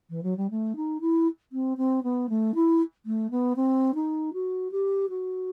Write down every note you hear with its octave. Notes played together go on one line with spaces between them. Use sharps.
E3
F#3
G3
A3
D#4
E4
C4
C4
B3
A3
E4
A3
B3
C4
D#4
F#4
G4
F#4